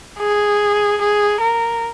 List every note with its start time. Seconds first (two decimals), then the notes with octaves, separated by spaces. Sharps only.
0.19 G#4
1.01 G#4
1.41 A#4